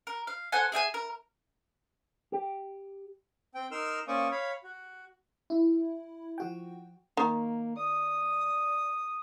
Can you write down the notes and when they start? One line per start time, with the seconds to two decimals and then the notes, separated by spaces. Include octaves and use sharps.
0.07 A#4
0.27 F5
0.52 A4 C5 F#5 G#5
0.72 G#4 E5 G5 G#5
0.94 A#4
2.32 G4
3.55 C4 G5
3.71 D#4 A#4 C6 E6 F6
4.08 A#3 C#4 C5 D5 C#6 D#6
4.31 C#5 F5 B5
4.64 F#4
5.50 E4
6.38 F3 F#4 G5
7.17 D#3 A#3
7.77 D5 D#6